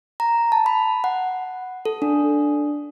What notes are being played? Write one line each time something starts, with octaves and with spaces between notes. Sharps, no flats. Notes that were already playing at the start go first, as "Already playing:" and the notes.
A#5
A5
B5
F#5
A4
D4